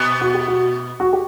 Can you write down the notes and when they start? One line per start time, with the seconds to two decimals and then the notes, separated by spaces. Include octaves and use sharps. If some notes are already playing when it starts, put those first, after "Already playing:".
Already playing: B2 B3
0.21 F#4
0.34 G4
0.47 F#4
1.00 F#4
1.13 G4